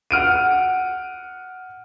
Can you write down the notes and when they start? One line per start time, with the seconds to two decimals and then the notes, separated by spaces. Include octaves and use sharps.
0.11 F#5 F6 D7 D#7